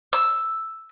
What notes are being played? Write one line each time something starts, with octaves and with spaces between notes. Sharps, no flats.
E6